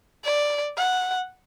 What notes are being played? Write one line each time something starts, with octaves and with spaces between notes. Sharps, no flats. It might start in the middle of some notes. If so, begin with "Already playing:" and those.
D5
F#5